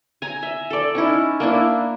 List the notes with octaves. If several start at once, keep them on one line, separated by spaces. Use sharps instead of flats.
G#5 A#5
E5
A4 D5
C#4 D#4 E4
A#3 D4 E4